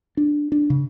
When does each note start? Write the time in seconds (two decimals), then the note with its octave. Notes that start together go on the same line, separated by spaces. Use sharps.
0.17 D4
0.52 D4
0.70 C#3